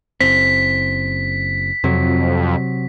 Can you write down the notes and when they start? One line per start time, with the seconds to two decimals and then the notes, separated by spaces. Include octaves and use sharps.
0.21 F#1 C4 B6
1.84 F2 C3 F#3